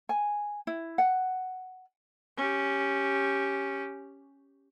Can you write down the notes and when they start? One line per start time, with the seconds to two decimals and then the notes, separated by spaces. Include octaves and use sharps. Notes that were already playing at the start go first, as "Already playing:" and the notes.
0.09 G#5
0.67 E4
0.98 F#5
2.37 C#4 G4